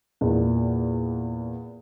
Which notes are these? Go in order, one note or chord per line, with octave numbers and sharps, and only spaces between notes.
E2 A#2